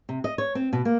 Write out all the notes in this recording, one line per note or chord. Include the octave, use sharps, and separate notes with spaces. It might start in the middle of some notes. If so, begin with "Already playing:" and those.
C3
D#5
C#5
C4
B2
A#3